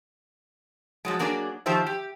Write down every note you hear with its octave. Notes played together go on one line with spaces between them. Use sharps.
F3 F#3 G#3
F#3 A#3 D4 G#4 C#5 D5
D#3 F3 G4 C5 E5
G4